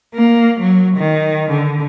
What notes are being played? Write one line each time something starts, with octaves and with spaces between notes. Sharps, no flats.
A#3
F#3
D#3
D3